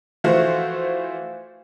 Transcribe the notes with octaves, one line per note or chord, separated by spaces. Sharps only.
E3 F3 A3 F4 F#4 C5